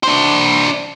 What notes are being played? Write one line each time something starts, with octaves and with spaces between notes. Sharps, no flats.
D4 C5